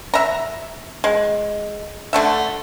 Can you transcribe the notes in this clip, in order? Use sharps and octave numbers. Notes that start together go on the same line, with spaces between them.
E5 A#5
G#3
D3 A3 E5